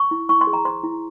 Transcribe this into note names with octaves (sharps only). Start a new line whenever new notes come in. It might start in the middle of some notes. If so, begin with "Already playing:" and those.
Already playing: C#6
E4
E4 C#6
C6
G#4
A#5
C5 C6
E4